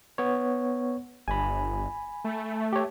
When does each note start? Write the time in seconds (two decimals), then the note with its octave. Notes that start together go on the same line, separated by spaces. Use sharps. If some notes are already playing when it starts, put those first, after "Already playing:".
0.18 B3 C#5
1.28 G1 G#5 B5
2.24 A3
2.73 G4 C#5